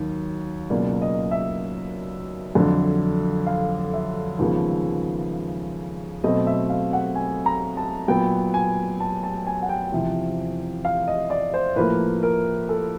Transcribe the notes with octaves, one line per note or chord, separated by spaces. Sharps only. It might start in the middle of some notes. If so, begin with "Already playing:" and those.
Already playing: D#2 D#3 F#3
C#2 B2 F#3 A#3 D5
D#5
E5
F2 D3 F#3
F5
E5
D#2 C#3 F3 G#3 B3
B2 F#3 A3 C4 D#5
E5
F5
F#5
G#5
A#5
A5
A#2 F#3 B3 G5
G#5
A5
A5
G#5
F#5
G5
E2 C3 F3
F5
D#5
D5
C5
A2 F3 A#3 B4
A#4
A4